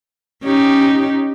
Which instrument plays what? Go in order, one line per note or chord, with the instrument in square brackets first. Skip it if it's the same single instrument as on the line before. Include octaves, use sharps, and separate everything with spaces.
[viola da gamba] C#4 D#4 G4